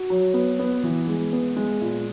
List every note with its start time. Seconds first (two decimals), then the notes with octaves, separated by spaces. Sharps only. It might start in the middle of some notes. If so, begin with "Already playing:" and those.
Already playing: F#4
0.10 F#3
0.34 B3
0.59 B3
0.83 E3
1.08 G#3
1.33 B3
1.56 G#3
1.81 A#2